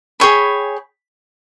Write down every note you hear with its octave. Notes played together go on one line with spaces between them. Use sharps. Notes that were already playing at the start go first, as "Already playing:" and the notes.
G#4 C#5 G5 B5